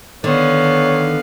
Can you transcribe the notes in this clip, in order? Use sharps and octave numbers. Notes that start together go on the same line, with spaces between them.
D3 D#3 B3 C#5 F5